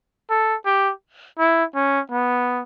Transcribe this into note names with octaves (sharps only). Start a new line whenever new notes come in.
A4
G4
E4
C#4
B3